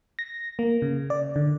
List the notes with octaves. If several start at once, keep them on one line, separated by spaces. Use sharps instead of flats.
A#6
A#3
C#3
D5
D3